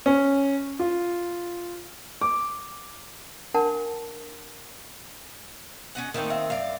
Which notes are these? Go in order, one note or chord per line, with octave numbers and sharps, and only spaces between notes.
C#4
F4
D6
D4 A#4 F#5 A5
C#4 D#5 F#5
D#3 A3 A#3 C4 D#4
E5 F5
F#2 D5 F5